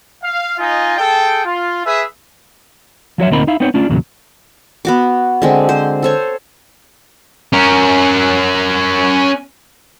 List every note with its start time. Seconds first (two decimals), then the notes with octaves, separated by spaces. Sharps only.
0.23 F5
0.58 D#4 F4 D#5 G#5
0.97 G#4 A4 G5
1.45 F4
1.85 G#4 B4 E5
3.18 F3 F#3 C#5 E5
3.30 D2 A#2 C4 D#4 A#4 B5
3.47 D#4 E4 F5
3.60 B3 C4 D#4 C5 C#5
3.74 A3 C#4 D4 F4
3.90 E2 A#2 C#3 F#3
4.85 B3 F#4 D6
5.42 D3 G#3 C4
5.69 C5
6.03 A4 C5 C#5
7.53 C#4 A#4